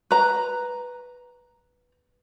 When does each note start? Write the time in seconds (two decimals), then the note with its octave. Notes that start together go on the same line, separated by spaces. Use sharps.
0.11 B4 A#5